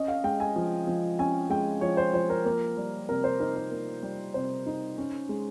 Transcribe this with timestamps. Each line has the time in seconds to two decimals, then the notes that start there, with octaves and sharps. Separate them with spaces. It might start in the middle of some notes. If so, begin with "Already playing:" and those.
Already playing: C#4 D#5
0.08 F5
0.24 G#3 G5
0.40 G#5
0.56 F3
0.87 F3
1.19 C#4 G#5
1.50 G#3 G5
1.81 F3 C#5
1.97 C5
2.13 F3 C5
2.30 A#4
2.45 A#3
2.77 G3
3.09 C3 A#4
3.24 C5
3.40 D#4 A#4
3.55 A#4
3.71 A#3
4.03 G3
4.34 C3 C5
4.66 D#4
4.98 C#4
5.29 G#3